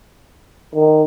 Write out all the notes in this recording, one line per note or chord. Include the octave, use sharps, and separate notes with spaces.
D#3